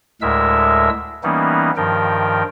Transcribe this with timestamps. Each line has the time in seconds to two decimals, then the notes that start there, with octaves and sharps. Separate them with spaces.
0.22 D2 A2 G#3 A#4 E5 E6
1.23 E3 G3 A#3 B3 C#4 D#4
1.77 G2 D#3 F3 A#4 G5